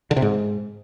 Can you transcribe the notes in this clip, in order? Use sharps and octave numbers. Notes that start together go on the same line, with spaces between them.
D3
C3
G#2